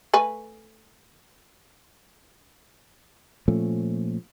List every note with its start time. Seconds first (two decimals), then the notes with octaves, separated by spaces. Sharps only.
0.14 A3 B4 G#5
3.48 A#2 F3 A3 C#4